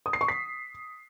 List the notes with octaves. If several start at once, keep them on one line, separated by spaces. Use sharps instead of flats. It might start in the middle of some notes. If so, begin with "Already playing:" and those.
D#6
C7
C#6
B6